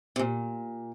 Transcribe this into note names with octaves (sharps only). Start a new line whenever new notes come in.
C3
A#2